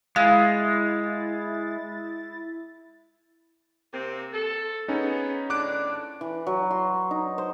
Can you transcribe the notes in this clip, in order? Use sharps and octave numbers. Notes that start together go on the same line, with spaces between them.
G#3 E4 F5 A6
C3 A#3 C4
A4
B3 C#4 D#4 G#4
A2 D3 D4 D6 F#6 D7
E3
F#3
C6
D#4
C5